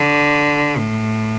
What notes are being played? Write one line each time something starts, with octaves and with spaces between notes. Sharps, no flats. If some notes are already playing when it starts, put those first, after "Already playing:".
Already playing: D3
A2